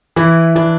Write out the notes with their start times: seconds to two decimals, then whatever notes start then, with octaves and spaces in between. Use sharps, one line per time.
0.16 E3 E4
0.55 E3 D4